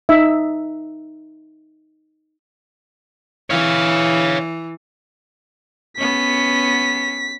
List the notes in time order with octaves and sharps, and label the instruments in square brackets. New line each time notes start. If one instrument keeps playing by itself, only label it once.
[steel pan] D#4 E5
[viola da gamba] E3 [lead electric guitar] C#5 F5
[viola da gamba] B3 C#4 [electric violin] B6